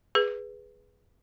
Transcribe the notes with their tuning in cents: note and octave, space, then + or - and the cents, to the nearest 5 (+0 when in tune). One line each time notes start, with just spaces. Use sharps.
G#4 -5 B4 +0